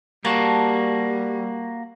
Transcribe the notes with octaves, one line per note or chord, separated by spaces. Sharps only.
G3 A#3 F#4 A5